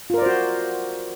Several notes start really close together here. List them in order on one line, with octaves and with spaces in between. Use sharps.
F4 A#4 D5 C5 F#4